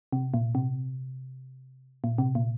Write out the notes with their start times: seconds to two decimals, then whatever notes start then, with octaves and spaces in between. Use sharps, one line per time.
0.12 C3
0.34 A#2
0.55 C3
2.04 A#2
2.18 C3
2.35 A#2